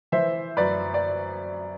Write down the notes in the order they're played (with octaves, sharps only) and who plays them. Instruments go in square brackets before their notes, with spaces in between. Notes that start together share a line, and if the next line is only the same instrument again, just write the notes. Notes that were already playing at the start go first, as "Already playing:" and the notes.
[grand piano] E3 C5 E5
F#2 B4 D5
D5